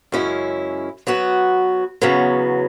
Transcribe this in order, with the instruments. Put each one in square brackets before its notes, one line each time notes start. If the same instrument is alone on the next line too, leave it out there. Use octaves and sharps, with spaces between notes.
[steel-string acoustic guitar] F#2 C#3 G#3 C#4 E4
F#3 B3 F#4 B4
E2 C#3 F#3 B3